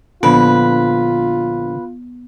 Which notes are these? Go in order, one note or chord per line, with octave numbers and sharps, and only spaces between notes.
A#1 D3 F3 B3 F4 B4